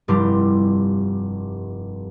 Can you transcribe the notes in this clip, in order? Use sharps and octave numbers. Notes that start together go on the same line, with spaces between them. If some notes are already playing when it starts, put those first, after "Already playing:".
F1 G2 G3 E4 G4 C6